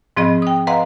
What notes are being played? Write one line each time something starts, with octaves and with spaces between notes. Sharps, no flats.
G#2 F3 C4 G#4 D#5 B5
G5 D#6
B4 D#5 F5 F#5 A#5 C6